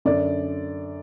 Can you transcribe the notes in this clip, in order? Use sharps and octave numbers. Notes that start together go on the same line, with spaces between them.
F#2 D3 D5